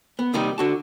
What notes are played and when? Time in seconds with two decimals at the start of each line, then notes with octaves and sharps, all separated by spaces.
0.19 B3
0.33 D#2 C3 D#3 G3 D#4
0.58 D3 F#4 A5